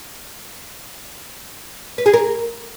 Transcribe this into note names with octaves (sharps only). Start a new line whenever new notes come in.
B4
G#4
A#4